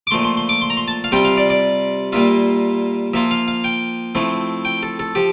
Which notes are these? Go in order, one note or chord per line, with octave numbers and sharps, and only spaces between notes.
D6
A#2 F3 A3 C6
C6
C6
D6
C6
A#5
C6
A5
F5
C3 G3 C4 F4 G5
F5
D5
D5
A#2 G3 A#3 F4 E5
F3 A#3 F4 E5
F5
F5
G5
F3 A3 C4 E4
G5
A4
A4
F3 G4